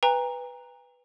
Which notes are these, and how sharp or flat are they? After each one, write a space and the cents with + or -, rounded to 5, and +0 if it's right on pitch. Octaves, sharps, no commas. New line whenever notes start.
B4 +0 G5 +45 A#5 +0